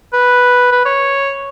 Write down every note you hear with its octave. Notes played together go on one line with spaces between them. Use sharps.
B4
B4
C#5